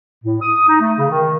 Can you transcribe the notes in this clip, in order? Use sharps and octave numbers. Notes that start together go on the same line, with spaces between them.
A2
D#6
D#4
A3
C#3
D#3